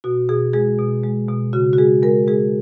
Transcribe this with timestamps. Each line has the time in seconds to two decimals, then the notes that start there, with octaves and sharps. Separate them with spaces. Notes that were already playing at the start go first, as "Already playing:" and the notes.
0.04 B2 F#4
0.29 B2 G#4
0.53 G#3 G#4
0.79 B2
1.04 G#3
1.28 B2
1.53 C#3 F#4
1.73 F#4
1.78 G#3 G#4
2.03 G#3 A#4
2.27 G#3 G#4